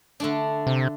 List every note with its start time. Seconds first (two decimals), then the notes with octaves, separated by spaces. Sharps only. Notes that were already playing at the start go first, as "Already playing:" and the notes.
0.20 D3 A3 D4
0.67 C3